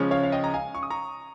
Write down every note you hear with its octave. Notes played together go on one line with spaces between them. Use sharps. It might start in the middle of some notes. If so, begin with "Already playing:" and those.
Already playing: C#3 F3 G#3 C#4
C#5 F5
F5
D#5 G5
A#5
F5 G#5
C#6
D#6
A#5 C#6